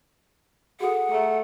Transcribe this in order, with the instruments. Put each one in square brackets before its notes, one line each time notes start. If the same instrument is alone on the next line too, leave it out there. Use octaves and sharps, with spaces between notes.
[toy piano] F#4 A4 [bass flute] G#4 [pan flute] F#5
[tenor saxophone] A3 [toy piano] A#5